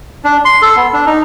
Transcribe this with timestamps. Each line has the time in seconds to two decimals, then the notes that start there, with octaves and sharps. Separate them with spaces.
0.24 D4
0.45 C6
0.62 A4
0.76 B3
0.93 D4
1.06 D#4